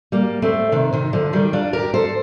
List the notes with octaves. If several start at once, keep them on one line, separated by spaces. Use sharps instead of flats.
G3 A#3
A3 C4
C3 D#3
C3 D#3
D3 F3
D#3 G3
D4 F4
G4 A#4
A4 C5